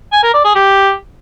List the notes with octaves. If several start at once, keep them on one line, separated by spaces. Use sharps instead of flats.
G#5
A#4
D5
G#4
G4